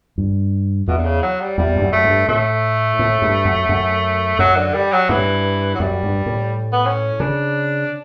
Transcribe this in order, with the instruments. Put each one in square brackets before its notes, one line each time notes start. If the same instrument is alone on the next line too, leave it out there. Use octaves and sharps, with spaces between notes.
[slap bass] G2
[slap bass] E2 [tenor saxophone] B2
[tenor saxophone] D3
C#3
F#3
G3
[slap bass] E2 [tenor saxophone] G3
[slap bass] G2
F#2
[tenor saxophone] A3
[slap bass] G2
[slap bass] A2 [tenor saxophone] A3
[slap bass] A2
G2
F#2
F#2
[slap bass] F#2 [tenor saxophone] F#3
[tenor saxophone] D3
G3
F#3
[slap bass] G2 [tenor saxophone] E3
[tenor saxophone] F#3
[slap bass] F#2 [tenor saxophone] G3
[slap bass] G2
A2
[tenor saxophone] B3
C#4
[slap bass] C#3 [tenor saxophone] D4